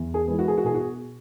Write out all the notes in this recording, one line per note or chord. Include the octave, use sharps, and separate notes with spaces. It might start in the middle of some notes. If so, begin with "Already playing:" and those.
Already playing: E2
G#4
E3 G#3 B3
F#4
G#4
F#4
B2 G#4
F#4